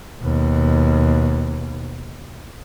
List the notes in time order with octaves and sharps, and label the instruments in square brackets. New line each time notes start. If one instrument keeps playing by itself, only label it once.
[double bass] D#2 B2